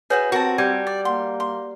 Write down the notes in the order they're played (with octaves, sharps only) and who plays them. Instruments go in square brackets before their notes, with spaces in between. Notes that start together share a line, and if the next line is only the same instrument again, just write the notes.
[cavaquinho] E4 F#4 G#4 [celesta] B4 C#5 G6
[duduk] C4 [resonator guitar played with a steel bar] F#4 [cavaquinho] A#4 A5
[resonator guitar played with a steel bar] G3 [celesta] G#6 D#7
[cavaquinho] D5
[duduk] A#3 [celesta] F#5 [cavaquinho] C6
[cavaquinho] C6